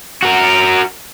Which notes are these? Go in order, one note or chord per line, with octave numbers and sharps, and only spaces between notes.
F#4 A#4